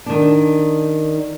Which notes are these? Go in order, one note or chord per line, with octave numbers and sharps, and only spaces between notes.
D#3 D4